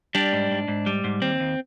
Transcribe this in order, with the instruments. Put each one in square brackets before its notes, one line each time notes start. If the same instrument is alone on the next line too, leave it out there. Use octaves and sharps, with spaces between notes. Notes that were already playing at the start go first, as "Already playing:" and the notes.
[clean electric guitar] G3 D4
G#2
G#2
G#2
G3
G#2
D#2 C4
D#2